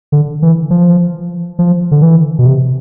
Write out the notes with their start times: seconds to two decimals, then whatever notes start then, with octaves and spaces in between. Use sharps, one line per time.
0.12 D3
0.42 E3
0.70 F3
1.59 F3
1.91 D3
2.02 E3
2.39 B2
2.46 C3